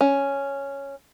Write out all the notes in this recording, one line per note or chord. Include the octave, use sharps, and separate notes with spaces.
C#4